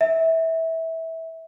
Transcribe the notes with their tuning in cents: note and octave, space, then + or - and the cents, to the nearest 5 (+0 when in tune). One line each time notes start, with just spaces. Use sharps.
E5 -20